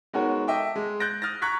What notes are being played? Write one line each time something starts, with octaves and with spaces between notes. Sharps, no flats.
G#3 B3 D#4 F#4 A#4 C#5
A4 D#5 E5 G5 D6
G#3
F#6 G6 A6 A#6 D7
D#6 F6 A6 A#6
A#5 C#6 F#6 G#6 B6